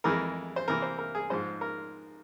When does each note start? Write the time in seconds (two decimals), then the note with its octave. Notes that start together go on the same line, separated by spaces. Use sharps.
0.04 F2 E3 G#3 A#4
0.56 C5
0.68 C3 E3 A#3 A#4
0.82 C5
0.98 A#4
1.15 G#4
1.30 G#2 F3 G#3 C5
1.61 A#4